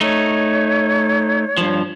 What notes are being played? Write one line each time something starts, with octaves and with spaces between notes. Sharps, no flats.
A3 D#4 C#5
G2 F3